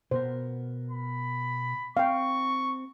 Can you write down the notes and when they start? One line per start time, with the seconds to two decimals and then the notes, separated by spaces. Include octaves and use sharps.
0.11 B2 B3 A#4 C5
0.91 B5
1.97 C4 F5 G5 C#6